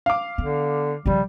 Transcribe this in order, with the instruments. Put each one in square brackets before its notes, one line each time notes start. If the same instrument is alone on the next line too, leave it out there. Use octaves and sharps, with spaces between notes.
[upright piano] F5 D6
[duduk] D3 [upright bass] B3
[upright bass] C#3 F3 [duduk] G3